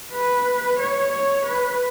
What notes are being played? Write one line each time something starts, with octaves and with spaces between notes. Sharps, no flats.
B4
C#5
C#5
B4